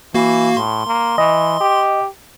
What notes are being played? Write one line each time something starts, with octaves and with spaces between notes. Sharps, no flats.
E3 A#3 F#4 F5
A2 C6
A#3
E3 D#5
G4